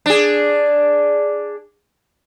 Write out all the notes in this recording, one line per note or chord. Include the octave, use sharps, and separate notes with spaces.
D4 G#4